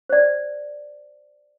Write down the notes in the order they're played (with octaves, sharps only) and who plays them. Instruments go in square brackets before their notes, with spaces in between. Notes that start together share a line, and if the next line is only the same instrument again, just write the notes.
[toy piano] C5 D5